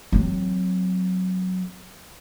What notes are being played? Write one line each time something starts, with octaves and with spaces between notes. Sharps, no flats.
F#3 C4